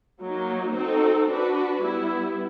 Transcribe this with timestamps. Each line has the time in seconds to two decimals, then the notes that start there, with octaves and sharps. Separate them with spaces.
0.21 F#3 A#3 D#4
0.75 C4 D#4 F#4 A4
1.29 D4 F#4 B4
1.83 G3 B3 E4